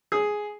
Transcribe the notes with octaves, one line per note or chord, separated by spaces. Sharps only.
G#4